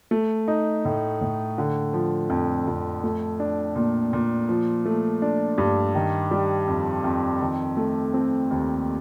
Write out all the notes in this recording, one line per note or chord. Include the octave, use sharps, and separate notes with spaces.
A3
D#4
A2
A2
D3
F3
F2
F2
A3
D4
A#2
A#2
F3
A3
D4
G2
D#3
G3
F2
F2
D#3
A3
C4
D#2